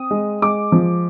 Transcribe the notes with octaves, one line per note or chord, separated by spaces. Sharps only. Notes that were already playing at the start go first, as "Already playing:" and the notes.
Already playing: C4 D#6
G#3
G#3 D6
F3